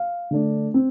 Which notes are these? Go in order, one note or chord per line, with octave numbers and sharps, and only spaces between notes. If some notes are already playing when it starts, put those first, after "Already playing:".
Already playing: F5
D3 A3 D4
C4